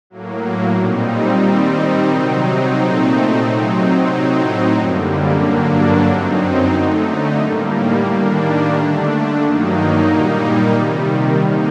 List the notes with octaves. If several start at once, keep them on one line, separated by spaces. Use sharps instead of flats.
A2 F#3 A#3
A#2 G3 C4 D#4
D#3 G3 C4 D#4
C3 F#3 C4 D#4
A#2 A3 C4 D#4
C3 F#3 C4 D#4
A2 F#3 C4 D#4
F#2 D3 G3 A#3
G2 D3 F#3 A#3 D4
F#2 F#3 C4 D#4
D3 A3 D#4
A2 G3 A#3
D#3 G3 A#3 D4
D3 A3 D4
G2 D#3 F#3 A#3 D#4
A#2 G3 A#3 D#4
C3 D#3 G3
D3 G3 A#3 D#4